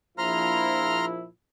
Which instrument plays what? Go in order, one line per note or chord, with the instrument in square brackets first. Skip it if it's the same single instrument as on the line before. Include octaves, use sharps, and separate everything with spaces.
[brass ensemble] A#1 F3 E4 [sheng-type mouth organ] A#5 C6 F6